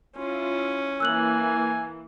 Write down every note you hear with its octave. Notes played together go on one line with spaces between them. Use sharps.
C#4 E4 F4
E3 A#3 G#5 E6 F#6 F#7